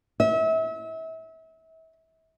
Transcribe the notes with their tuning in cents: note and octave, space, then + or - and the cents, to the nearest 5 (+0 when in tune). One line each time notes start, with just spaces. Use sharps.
E5 -35